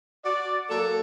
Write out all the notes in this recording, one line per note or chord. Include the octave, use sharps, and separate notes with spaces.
F#4 D5
F#3 A#3 A4